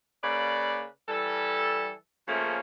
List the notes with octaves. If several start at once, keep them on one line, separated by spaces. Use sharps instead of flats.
C#3 A#3 B4 D5
E3 G3 A4
C#3 F3 A3 A#3 C#4